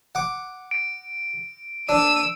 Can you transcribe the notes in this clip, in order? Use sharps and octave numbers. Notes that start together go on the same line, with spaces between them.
F#5 D6
D7
D4 E6 D#7